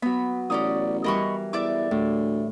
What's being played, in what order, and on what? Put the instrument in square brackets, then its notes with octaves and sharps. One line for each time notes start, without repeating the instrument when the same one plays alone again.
[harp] F#3 B3 [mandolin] B5
[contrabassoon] A1 [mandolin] C#4 D5 D#6
[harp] E3 G3 A#4 [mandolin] D#5 B5 C#6
[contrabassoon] E2 [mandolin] D5 E5 D6
[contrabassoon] D2 [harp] A2